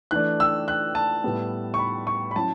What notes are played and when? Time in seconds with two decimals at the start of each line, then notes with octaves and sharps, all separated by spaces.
0.11 E3 A3 D4 F#6
0.40 E6
0.68 F#6
0.95 A5
1.24 A2 G3 B3
1.74 C#6
1.79 B5
2.07 C#6
2.31 B5
2.36 F#3 C#4 E4 A5